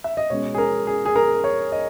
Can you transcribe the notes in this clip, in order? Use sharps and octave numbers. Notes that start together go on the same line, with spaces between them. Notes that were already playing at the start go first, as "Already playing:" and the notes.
E5
D#5
B2 G#3 C#4 C#5
G#4
A#4
G#4
G#4
A#4
C#5
D#5